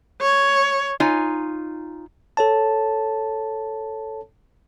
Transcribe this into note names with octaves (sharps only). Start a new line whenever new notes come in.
C#5
D#4 F4 C#5 G#5
A4 C#5 A5